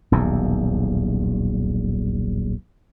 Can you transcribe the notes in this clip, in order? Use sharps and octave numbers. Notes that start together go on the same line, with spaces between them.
D#1 B1 E2